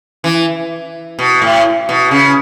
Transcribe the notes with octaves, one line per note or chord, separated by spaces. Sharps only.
E3
B2
A2
B2
C#3